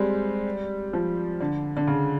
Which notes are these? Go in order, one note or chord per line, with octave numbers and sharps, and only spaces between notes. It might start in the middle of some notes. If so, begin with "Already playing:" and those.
Already playing: G3 G#3 C4
F3
D3
D3
C#3